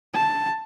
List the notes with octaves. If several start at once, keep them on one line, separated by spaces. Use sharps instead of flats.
A5